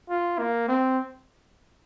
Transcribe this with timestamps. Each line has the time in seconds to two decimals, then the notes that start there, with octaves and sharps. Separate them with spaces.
0.10 F4
0.38 A#3
0.68 C4